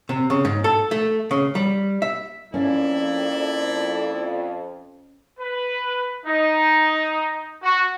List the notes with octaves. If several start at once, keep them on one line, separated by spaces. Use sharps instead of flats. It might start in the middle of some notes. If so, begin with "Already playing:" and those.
C3
C#3
G#2
A4
A3
C#3
G3
E5
F2 A#3 C#4 E4 D5
B4
D#4
F#4